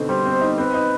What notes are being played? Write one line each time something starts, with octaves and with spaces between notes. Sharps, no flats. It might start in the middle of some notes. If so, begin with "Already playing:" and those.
Already playing: B2 D3 C4 D#4
G3 C5
C4
D#4
C4 B4
D#4